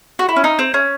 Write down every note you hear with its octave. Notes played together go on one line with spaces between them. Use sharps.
F#4
E4
C#4
D#4
C4
C#4